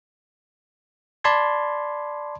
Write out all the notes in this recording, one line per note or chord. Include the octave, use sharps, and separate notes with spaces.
D5 A5 B5 C6 G#6